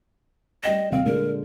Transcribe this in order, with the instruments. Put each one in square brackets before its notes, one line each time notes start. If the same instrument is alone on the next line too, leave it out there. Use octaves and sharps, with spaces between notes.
[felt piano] G3 G5 E7 [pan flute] D#5
[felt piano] D#1 F5 [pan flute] C4
[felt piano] A#2 D3 G#3 [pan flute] A#4